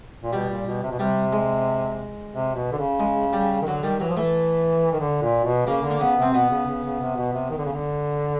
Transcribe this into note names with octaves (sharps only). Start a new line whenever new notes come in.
A#2
B2 G3
A#2
B2
C3
B2
C3 G3
G#3
C3
B2
D3
C#3
G#3
G3
D#3
D3 F#3
D#3 G3
E3 F#3
F3
E3 A3
D#3
D3
A#2
B2
C#3 A#3
D3
A#3
C#3 B3
C3 C4
B2 B3
C#3
C#3
C#3
C3
B2
C3
D#3
D3
C#3
D3